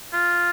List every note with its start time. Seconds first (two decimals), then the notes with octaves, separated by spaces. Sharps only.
0.13 F4